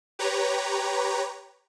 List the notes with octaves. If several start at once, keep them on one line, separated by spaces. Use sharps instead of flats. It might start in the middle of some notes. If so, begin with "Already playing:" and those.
G4 B4 C#5 A#5